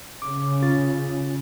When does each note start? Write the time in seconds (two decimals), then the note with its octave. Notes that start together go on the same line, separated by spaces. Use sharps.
0.22 C#3 D6
0.63 C#4 F4 A6